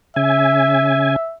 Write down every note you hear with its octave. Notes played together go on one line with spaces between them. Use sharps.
C#3 E5 G#5